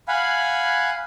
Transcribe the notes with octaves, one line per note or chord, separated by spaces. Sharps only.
F5 F#5 G#5 B5